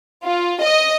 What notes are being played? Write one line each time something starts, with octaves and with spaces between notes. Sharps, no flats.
F4
D#5